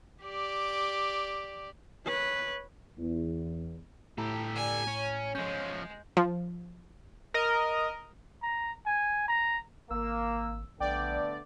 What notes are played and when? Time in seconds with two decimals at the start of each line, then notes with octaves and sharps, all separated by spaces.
0.22 G4 D5
2.05 B4 C#5
2.98 E2
4.18 A2 G4 A4 A#5
4.55 D5 G#5
4.88 C#4 C#5
5.35 F3 G#3 C#4 G6
6.17 F3
7.34 A#4 D#5
8.43 A#5
8.86 G#5
9.28 A#5
9.91 G#1 A#3 E6
10.80 A#1 D3 A3 B3 D5 G5